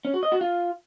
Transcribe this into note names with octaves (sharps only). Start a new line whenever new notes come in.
C#4
F#4
D#5
F#4
F4